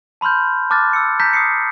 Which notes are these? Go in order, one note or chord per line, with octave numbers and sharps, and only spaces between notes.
A5 B5 C6 F6 G6
A5 D6 F6 F#6 A6
E6 C#7
A5 A#5 G6 A#6 B6
D#6 C7 C#7